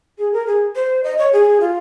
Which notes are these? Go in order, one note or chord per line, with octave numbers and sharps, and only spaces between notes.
G#4
A#4
G#4
C5
D#5
C#5
G#4
F4